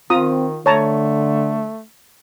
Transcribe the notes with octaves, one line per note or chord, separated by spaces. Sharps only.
D#3 C4 F4 A#5 D#6
D3 A3 C#5 A5 A#5